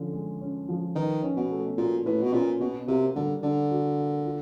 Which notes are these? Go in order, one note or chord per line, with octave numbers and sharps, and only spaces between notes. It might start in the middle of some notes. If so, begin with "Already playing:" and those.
Already playing: D3 F3 C#4
G#3
C#4
F3
D#3 B4
C#4
B2
A3
A#2 F#4
A2 B4
B2
A#2 C#4
B2 F#4
C3 A#3
D3 G3
D3 D4
F#4
A#3
F4